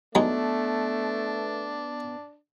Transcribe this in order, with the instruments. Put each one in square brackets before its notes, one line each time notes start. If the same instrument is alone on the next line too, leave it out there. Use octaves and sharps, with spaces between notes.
[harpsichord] F#3 G#3 D#4 [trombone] A3 [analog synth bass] B3 [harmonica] D4